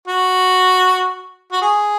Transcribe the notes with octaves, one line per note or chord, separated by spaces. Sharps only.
F#4
F#4
G#4